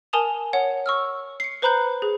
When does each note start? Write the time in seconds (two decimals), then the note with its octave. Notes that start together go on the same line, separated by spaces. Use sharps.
0.13 A#4 G#5 A5 D#6 F7
0.53 C#5 F#5
0.86 C#6 E6 F6
1.40 C7 C#7
1.62 B4 C5 A#5 B5 F#6 G6
2.02 G#4